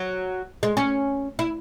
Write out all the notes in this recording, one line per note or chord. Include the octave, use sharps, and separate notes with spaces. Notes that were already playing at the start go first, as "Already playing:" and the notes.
Already playing: F#3
G#3
C#4
E4